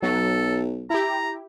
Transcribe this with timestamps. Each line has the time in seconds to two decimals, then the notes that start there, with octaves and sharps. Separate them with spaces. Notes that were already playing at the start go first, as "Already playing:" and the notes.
0.02 B1 F#3 A4
0.90 E4 G4 A#5